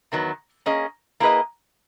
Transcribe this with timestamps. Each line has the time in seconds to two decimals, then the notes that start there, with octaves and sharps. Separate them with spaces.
0.12 E2 D#3 F#3 B3
0.66 A#3 C#4 G#4 D#5
1.20 A#3 E4 G#4 B4 D#5